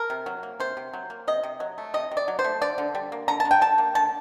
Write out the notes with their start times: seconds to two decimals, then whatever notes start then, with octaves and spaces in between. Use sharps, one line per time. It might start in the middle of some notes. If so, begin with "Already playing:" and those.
Already playing: A#4
0.10 C3
0.26 F#3
0.43 A#3
0.60 C3 C5
0.77 C3
0.93 F#3
1.10 A#3
1.28 C3 D#5
1.43 C3
1.60 F#3
1.78 A3
1.94 C3 D#5
2.11 C3
2.17 D5
2.28 F#3
2.39 C5
2.44 A3
2.61 D3 D5
2.78 D3
2.95 G3
3.12 A#3
3.28 D3 A#5
3.40 A5
3.45 D3
3.51 G5
3.61 G3 A5
3.78 A#3
3.95 D3 A5